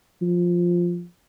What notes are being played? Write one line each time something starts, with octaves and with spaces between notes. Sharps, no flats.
F3